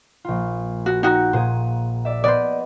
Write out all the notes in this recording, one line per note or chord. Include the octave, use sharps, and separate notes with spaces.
A#1 F4
F#4
D#4 F#4 F#5 G5 A#5
A#2 G#4 C5
D5 E5
B3 G#4 C5 D5 D#5